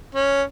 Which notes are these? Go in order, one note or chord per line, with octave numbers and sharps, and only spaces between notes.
C#4